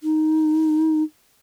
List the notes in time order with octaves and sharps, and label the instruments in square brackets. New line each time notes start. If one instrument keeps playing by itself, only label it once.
[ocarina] D#4